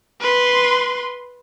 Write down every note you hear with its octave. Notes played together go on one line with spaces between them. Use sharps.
B4 C6